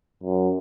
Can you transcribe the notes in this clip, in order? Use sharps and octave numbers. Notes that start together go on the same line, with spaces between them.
F#2